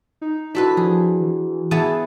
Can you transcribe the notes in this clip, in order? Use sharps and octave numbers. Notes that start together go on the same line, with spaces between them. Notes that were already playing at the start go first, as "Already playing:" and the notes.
D#4
D4 E4 F#4 A4 B4 B6
F3 G#4
E3
E3 B3 G#4 A5